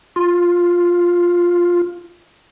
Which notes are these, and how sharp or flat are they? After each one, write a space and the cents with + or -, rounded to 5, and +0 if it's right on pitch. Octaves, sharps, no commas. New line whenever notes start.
F4 +5